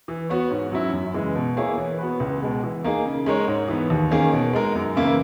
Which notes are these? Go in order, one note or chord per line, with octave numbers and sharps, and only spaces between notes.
E3
B3 F#4 C#5
G#2
F#3 C#4 E4
F#2
C#3 E3 G#3
B2
A#3 E4 G#4 C#5
E3
B3 F#4 B4
C#2
B2 G#3
E3
A#3 D#4 G#4
C#3
G#3 D#4 A#4 C#5
G#2
E3 B3
D#2
D#3 A#3 C#4 G#4
B2
G#3 D#4 A#4
F#2
C#3 E3 A#3 E4